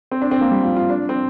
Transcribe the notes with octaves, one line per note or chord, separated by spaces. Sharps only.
C4
D4
C4
A#3
G3
F4
F4
D4
C4